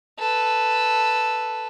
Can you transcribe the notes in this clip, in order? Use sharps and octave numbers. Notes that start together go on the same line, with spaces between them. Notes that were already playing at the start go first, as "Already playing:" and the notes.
A4 B4